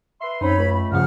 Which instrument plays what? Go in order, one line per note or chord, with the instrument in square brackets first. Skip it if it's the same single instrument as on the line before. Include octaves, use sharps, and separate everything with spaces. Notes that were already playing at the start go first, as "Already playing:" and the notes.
[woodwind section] B4 E5 C6
[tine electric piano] F#2 [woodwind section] C4 D#4 [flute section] C#5 B5
[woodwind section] C#2 A3
[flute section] B5
[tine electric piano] G2 C#3 F3 [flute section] G#4 F#5 F6